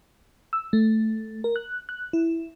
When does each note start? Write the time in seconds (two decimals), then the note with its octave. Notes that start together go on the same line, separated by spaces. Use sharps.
0.53 E6
0.73 A3
1.44 A#4
1.56 F#6
1.89 F#6
2.13 E4